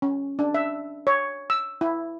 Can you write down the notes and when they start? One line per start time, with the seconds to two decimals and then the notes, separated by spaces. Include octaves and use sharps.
0.02 C#4
0.39 D4
0.54 E5
1.07 C#5
1.50 E6
1.81 E4